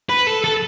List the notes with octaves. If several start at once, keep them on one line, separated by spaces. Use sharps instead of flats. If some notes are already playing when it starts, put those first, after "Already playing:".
B4
A4
A4